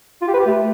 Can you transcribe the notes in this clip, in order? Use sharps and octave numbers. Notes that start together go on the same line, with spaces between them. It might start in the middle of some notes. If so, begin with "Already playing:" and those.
F4
G4
B4
G4
A3